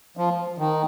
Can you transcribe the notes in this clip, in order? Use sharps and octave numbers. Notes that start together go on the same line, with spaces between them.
F3
D#3